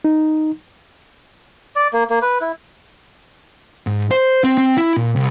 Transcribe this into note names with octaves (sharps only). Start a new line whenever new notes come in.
D#4
D5
A#3
A#3
B4
E4
G#2
C5
C4
C4
E4
A#2
C2